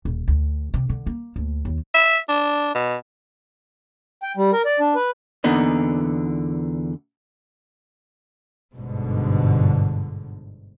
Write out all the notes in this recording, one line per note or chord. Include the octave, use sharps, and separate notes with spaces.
D#1
D2
C3
D3
A#3
D2
D#2
E5
D4
B2
G5
G3
A#4
D5
D4
B4
E2 A#2 D3 B3 D#4
G1 G#2 B2 D3